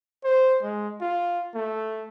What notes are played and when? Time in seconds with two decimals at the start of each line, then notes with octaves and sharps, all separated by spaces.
0.24 C5
0.63 G#3
1.01 F4
1.55 A3